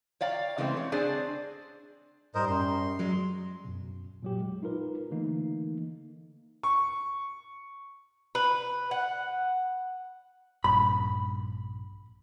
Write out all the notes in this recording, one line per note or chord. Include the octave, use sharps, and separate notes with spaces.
C#5 D5 F5 G5 A#5
C#3 E3 G#3 A3 C4
C#5
C4 D4 G#4 C5 D5 G#5
G#2 G3 A#4 C5 D#5
F#2 C6
F#3 G#3
F#2 B2
A#2 F#3 G4
G#3
D#4 F4 A#4 B4
D3 E3 A3 A#3 D#4
C#6
B4
F#5
A#1 G2 A#2 B5